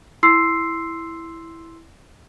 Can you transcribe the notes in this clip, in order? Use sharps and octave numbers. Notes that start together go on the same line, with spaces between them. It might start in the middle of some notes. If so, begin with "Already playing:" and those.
E4 C6 E6 C7